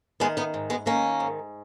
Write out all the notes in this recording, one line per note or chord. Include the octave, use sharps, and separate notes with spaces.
D#3 G#3 B3
B3 D#4
G#2
G#3 B3
D#3 A#3 C#4
G#2